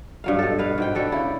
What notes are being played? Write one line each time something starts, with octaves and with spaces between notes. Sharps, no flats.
G2 F#3 F5
B2 A4
B2 B4 F5
G#2 B2 G5
G3 F#4 A4 B4
C#3 E4 D5